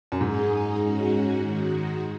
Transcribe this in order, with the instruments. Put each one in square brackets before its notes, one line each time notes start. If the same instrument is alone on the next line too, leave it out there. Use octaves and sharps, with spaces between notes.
[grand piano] F#2
[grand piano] G#2 [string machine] G#3 D#4 G#4
[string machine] G#3 C#4 F#4
D#3 G#3 F#4